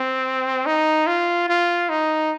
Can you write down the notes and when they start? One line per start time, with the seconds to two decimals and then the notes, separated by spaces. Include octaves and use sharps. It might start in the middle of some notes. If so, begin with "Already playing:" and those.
Already playing: C4
0.66 D#4
1.07 F4
1.49 F4
1.89 D#4